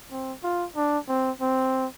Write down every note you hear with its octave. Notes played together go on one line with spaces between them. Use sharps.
C4
F4
D4
C4
C4